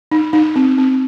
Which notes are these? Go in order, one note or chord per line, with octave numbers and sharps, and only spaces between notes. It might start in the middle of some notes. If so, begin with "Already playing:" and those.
D#4
D#4
C4
C4